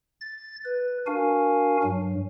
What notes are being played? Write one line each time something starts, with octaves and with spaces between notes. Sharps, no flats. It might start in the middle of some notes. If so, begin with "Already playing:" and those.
A6
B4
D4 F#4 A#4 F5 G#5
G2 F#3